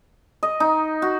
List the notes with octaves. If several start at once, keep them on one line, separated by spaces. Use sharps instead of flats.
D#5
D#4
F#4